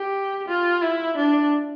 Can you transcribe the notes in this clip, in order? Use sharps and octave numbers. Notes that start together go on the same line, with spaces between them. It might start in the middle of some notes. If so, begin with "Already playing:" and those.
Already playing: G4
F4
E4
D4